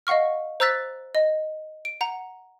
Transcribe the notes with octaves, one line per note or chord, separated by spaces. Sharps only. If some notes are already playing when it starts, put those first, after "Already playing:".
D#5 F5 F#5 C#6 F6
C5 A#5 E6 F#6 A6 B6
D#5
D7
F#5 A#5